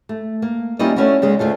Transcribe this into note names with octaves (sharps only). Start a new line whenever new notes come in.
A3
A#3
G3 A#3 C#4 E4 F4 D#5
A3 C#4 D4 E4 F#4
D2 C#3 G#3 D#5
D2 A3 F4 A4